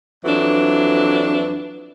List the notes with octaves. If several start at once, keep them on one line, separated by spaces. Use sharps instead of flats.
F2 E3 F#3 D4